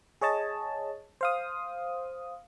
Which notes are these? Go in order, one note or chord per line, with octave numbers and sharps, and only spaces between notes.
G#4 C#5 D#5 A5
C5 F5 D#6